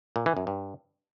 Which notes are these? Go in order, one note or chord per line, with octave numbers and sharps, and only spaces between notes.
A#2
E3
F#2
G2